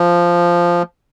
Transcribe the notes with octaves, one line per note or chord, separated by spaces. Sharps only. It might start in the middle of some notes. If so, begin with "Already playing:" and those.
Already playing: F3